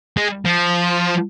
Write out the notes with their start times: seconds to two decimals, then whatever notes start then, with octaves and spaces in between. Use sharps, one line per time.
0.17 G#3
0.45 F3